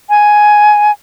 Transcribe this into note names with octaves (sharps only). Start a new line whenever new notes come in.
G#5